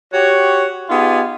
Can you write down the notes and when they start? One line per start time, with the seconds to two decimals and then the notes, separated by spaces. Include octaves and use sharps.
0.14 F#4 G4 C#5
0.89 B3 D#4 F4 G4 G#4